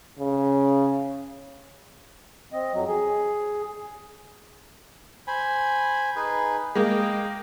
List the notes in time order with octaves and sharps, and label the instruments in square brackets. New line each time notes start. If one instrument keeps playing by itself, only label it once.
[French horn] C#3
[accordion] C4 D#5
F2 F#3
G#4
[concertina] C5 G#5 B5
D#4 G#4 B4
[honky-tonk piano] G#3 A#3 [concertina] D#5 G5